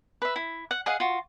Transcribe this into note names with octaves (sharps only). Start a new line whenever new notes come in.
B4 E5
E4
F#5
G#4 D#5 F5 F#5
F4 F#4